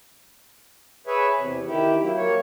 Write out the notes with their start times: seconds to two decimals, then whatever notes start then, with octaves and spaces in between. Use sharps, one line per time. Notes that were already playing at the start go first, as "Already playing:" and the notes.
1.07 G#4 B4 C#5 E5
1.38 E2 C3
1.67 D#3 E4 G4
2.02 F#3 A#3 E4
2.17 A#3 C#5